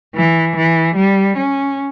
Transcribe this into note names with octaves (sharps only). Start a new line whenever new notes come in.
E3
E3
G3
C#4